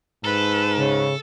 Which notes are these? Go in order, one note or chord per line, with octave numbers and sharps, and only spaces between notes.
G#2 A4 B4
C#3